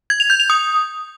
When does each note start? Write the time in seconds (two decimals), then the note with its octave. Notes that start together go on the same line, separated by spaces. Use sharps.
0.10 G#6
0.20 F7
0.30 G6
0.40 F7
0.50 D#6